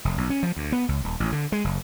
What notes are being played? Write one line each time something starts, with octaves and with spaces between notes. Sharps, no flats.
F1
B1
C#4
F3
D2
B3
C#2
D#1
A1
D3
G#3
F#1